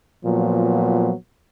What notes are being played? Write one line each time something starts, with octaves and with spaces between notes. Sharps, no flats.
A#2 F3 F#3 B3